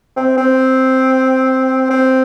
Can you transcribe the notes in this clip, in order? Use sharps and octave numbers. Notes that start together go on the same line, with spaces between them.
C4
C4
C4